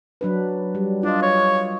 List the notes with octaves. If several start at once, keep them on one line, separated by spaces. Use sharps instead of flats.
F#3 D4 B4
G3
D4 F4 D#5
C#5